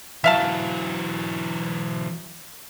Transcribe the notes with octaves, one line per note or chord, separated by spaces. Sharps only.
E3 F#3 E5 F5 A5